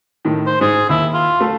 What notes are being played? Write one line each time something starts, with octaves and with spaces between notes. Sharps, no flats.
A2 D#3
C5
G#2 G#4
D#2 E4
F4
A3 F5